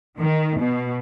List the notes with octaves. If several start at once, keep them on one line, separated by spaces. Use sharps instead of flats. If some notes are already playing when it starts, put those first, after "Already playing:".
D#3
B2